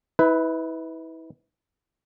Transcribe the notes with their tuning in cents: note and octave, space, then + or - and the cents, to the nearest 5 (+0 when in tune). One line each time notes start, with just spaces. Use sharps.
E4 -35 B4 +5